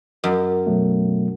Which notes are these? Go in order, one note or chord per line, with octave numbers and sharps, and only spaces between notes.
F#2
B2 F#3 A3